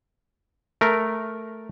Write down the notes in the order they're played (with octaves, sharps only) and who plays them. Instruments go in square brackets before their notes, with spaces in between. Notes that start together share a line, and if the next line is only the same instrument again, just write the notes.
[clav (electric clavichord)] A3 A#4